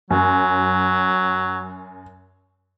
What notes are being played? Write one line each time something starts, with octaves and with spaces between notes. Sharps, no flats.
F#2 F#3